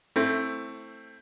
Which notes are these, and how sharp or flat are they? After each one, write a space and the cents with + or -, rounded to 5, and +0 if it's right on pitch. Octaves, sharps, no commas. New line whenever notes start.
A3 +15 C4 +15 E4 +0